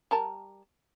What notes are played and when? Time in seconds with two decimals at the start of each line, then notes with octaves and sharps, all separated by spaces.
0.11 G3 A#4 A5